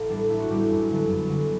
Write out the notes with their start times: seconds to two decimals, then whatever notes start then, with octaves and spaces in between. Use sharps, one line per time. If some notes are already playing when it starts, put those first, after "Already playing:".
Already playing: A1
0.09 A2 G3 B3 D4
0.29 A1 E4
0.40 F#4
0.49 A2 G3 B3 G4
0.60 G4
0.69 F#2
0.90 D3 F#3 B3
1.10 F#2
1.30 D3 F#3 B3